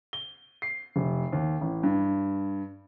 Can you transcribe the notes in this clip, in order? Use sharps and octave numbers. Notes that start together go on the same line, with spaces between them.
G7
C7
F1
D#2
A1
G2